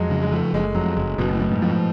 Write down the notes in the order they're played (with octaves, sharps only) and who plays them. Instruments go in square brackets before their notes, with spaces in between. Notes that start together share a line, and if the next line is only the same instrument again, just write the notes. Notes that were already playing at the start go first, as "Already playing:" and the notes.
Already playing: [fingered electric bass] F2 [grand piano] F#3 G#3
[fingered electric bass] C#3
[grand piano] G#3
[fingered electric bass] F3 [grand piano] A3
[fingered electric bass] F#1 [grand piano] G#3
[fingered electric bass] F2 [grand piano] F#3
[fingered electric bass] F#1 [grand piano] G#3
[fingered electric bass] F#1 [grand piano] B2
[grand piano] A2
[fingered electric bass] F#2 [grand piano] A2
[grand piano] G#2
[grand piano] A2 [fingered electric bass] F3